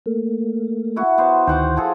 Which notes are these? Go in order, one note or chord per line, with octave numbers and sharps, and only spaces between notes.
A3 A#3
E4 F#4
B3 C5
D2 D#3 C5 F#5 G5 D6
F3 G#4 A4